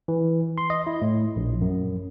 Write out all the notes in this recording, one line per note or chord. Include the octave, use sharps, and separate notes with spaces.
E3
C6
D#5
E4
A2
A#1
F#2